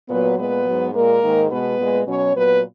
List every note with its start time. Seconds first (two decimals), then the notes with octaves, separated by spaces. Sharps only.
0.09 A#2 F#3 B3 B4
0.37 A#2 G#3 B3 B4
0.66 G#2 F#3
0.93 A#2 G#3 A#3 A#4
1.22 G#2 D#3 G#3
1.50 B2 G#3 B3 B4
1.79 A#2 G#3
2.07 B2 F#3 C#4 C#5
2.35 A#2 F#3 B3 B4